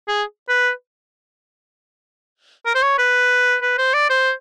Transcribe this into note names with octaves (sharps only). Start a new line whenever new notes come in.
G#4
B4
A#4
C5
C#5
B4
B4
C5
D5
C5